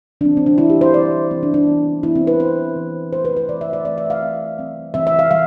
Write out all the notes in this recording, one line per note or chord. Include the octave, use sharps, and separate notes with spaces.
E3 G3 C4 D4
C4
D4
E3 G3 C4 E4
G4
C5
E3 G3 C4 D5
E3 G3 C4
D4
D4
E3 B3
E3 B3 E4
C4
B4
E3 B3 C5
E3 B3
E3 A3 C4 C5
B4
B4
E3 A3 C4 D5
E5
D5
E3 A3 C4 D5
E5
F5
E3 A3 C4
E3 G3 C4
E3 G3 C4 E5
E5
F5
E3 G3 F5